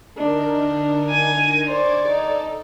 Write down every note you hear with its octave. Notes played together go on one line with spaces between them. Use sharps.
D3 D4 D#4 A#4
G#5
C5 D5 C#6 D6 G#6
D#4 A4